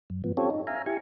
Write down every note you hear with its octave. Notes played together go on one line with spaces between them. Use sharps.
F#2
G#2 F3 B3
C4 C#4 F4 G4 A4 C#5
D#4
E5 F5 G#5 A#5
E4 G4 G#5 C#6